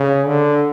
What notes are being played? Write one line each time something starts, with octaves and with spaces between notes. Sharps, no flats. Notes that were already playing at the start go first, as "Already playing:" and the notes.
Already playing: C#3
D3